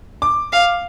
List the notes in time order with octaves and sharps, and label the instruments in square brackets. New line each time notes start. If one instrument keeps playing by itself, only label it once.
[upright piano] D6
[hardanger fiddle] F5